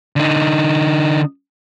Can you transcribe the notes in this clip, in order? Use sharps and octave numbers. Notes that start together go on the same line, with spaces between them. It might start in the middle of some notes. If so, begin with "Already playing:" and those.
D3 D#4